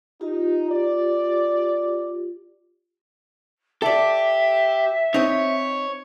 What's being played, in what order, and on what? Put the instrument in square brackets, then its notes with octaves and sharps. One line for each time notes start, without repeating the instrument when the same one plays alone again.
[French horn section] D#4 [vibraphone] F4 G4
[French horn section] D5
[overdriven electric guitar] G4 [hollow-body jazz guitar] A4 D5 [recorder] E5
[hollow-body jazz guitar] C4 D#4 [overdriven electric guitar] C#5